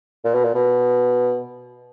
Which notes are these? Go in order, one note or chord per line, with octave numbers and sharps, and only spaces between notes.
A#2
B2
A#2
B2